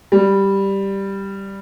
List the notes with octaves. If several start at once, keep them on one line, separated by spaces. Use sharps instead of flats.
G3